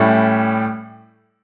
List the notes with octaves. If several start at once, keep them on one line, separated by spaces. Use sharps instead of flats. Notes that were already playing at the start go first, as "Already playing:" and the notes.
Already playing: A2 G3 C#4 E4